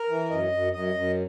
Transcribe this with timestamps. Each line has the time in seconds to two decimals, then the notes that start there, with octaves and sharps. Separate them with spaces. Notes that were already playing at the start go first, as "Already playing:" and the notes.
Already playing: A#4
0.09 E3
0.30 F#2 D#5
0.52 F#2
0.73 F#2 D#5
0.95 F#2